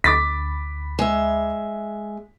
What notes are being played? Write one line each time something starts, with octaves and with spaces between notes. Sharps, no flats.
D2 B5 D6 A6 B6
G#3 E5